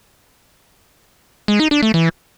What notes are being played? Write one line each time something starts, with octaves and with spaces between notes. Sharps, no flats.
G#3
D#4
D4
A3
E3